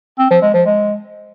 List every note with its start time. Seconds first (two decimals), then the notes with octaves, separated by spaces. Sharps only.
0.19 C4
0.30 F3
0.42 G#3
0.54 F3
0.66 G#3